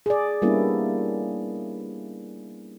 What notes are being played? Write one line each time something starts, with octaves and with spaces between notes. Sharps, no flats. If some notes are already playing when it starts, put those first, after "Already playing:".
G#4 D5
G3 A#3 B3 C#4 D4 E4